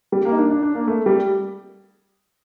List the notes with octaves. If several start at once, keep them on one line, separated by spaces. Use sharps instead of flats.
G3
A#3
D#4
D4
D4
D4
A#3
A3
G3